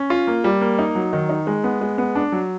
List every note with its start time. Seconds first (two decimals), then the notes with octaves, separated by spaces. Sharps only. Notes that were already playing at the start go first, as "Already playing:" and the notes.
Already playing: C#4
0.10 F4
0.27 A#3
0.44 G3
0.61 A#3
0.79 D#4
0.95 F#3
1.13 D#3
1.29 D#4
1.47 G#3
1.64 B3
1.81 G#3
1.98 B3
2.15 D4
2.32 F#3